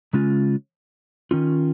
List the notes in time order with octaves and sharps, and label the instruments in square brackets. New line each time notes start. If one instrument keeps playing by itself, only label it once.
[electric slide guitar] C#3 G#3 C#4 F4
D#3 C#4 F4